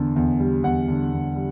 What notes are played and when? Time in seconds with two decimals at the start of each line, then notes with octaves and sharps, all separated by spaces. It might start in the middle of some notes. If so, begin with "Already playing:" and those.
Already playing: E2 D3
0.16 E2
0.40 G3
0.63 E2 F#5
0.88 D3
1.12 E2
1.36 G3